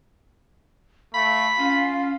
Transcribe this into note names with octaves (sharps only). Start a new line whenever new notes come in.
A3 F5 B5
C#4 F4